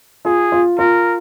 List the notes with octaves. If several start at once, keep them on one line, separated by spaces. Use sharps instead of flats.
F4 G#4
F4
F4 A#4